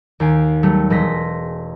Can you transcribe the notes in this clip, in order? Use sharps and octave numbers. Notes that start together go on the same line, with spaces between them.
D#2 G#5 C7 D7
F#3 G3 A3
E1 A3 G#4 C6 A#6 B6